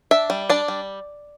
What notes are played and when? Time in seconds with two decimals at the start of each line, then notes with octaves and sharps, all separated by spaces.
0.11 D4 E5
0.30 G3
0.49 D4 D5
0.68 G3